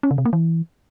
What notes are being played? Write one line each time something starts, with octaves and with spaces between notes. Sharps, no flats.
C#4
C#3
C3
A#3
E3